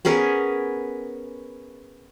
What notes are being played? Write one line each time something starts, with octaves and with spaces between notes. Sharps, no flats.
B3 C#4 G#4 A#4